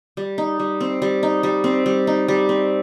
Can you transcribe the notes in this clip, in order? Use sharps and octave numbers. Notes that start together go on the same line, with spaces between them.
G3
D#4
G3
C4
G3
D#4
G3
C4
G3
D#4
G3
C4